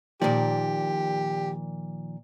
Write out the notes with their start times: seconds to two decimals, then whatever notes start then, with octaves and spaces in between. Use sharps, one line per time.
0.22 A#2 D#3 F3 G4 A#4 D5